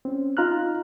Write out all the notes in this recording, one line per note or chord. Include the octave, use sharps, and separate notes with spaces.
C4 C#4
D#4 F4 A#5 F6 F#6